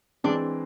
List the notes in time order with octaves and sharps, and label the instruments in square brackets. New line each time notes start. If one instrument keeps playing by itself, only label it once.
[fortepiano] E3 G#3 C4 [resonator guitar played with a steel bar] D4